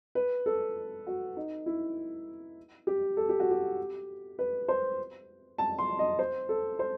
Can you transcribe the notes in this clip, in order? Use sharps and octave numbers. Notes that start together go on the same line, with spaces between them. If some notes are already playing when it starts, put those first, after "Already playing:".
B4
A4
F#4
D#4
E4
G4
A4
G4
F#4
G4
B4
C5
A5
C6
D#5
C5
A4
C5